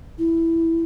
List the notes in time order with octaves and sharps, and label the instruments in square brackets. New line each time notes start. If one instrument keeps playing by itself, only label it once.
[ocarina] E4